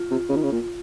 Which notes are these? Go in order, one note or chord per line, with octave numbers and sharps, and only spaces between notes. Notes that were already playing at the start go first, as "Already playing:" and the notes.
Already playing: F4
C3
C#3
D#3
C#3
A#2